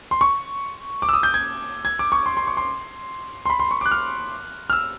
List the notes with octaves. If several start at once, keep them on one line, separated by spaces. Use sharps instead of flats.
C6
C#6
D6
E6
D#6
G6
G#6
G#6
D6
C#6
C6
C6
C#6
C6
C6
B5
C6
C#6
D6
F#6
F6
F6
E6